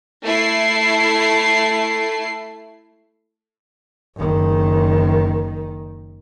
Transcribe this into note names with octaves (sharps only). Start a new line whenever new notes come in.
A3 E4 C7
F#1 D#3